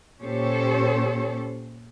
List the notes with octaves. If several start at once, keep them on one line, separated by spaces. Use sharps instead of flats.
A#2 C#4 G4 A4 C5 C#5